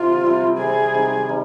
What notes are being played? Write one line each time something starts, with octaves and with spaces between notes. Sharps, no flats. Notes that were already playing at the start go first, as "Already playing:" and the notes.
Already playing: C3 F4
C3 G3 C4
C3 G3 C4 G#4
C3 D#3 G3
C3 D#3 G3